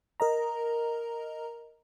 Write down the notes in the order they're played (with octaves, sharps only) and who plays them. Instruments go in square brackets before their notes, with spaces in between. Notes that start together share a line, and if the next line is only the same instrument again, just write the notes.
[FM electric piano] A#4 D#5 A#5